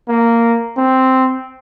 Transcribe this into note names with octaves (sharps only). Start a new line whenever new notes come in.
A#3
C4